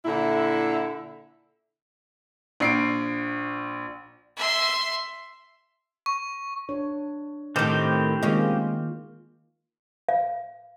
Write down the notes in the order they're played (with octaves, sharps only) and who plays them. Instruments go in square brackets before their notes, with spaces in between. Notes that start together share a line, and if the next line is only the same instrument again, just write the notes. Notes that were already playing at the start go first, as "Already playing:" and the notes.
[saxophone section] A#2 D3 E4
[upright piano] A#1 C7 D7
[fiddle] E5 C6
[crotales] C#6
[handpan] D4 C#5
[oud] A2 D#3 [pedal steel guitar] C4 G4 C5
[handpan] D#3 A#3 F4 [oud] G#3 C#4
[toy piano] F5